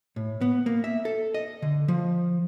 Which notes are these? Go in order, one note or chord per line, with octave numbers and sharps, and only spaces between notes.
A2
B3
A#3
E5
A4
D#5
D3
F3